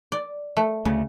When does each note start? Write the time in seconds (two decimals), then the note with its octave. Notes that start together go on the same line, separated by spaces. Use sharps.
0.12 D5
0.57 A3
0.85 D2 C#3 A3